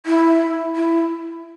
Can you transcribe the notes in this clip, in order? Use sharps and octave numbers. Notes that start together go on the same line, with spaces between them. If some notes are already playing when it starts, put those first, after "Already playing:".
E4
E4